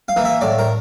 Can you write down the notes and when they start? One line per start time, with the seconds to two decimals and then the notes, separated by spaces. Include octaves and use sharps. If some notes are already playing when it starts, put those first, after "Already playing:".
0.08 F5
0.16 E3 A#3
0.25 E5
0.41 A2 D5
0.59 A#4